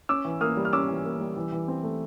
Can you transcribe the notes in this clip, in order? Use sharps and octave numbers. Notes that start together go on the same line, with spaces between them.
C#4 D6 E6
E3
A#3 D#6 F6
G3
F6
C#4 D6 E6
E3
A#3
G3
E3
E3
C4
A3